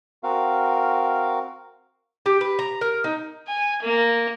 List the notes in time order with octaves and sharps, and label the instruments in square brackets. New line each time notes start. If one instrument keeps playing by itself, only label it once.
[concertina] C4 F#4 A#4 F5
[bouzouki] G4
B4
A#5
A#4
D#4
[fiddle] G#5
A#3